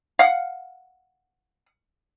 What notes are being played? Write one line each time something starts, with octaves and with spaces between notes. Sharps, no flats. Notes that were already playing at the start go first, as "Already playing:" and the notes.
F5 F#5